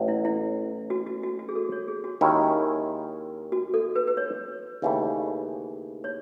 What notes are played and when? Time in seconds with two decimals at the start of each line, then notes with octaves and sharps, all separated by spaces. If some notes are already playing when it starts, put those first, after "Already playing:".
Already playing: A1 A2 F#3
0.08 E4
0.25 E4
0.90 F#4
1.07 F#4
1.23 F#4
1.39 F#4
1.49 G#4
1.55 A4
1.72 C#5
1.88 G#4
2.04 F#4
2.21 D#2 D#3 G#3 C#4 E4
3.52 F#4
3.74 A4
3.96 B4
4.07 B4
4.17 C#5
4.82 D#2 C#3 E3 A3
6.04 C#5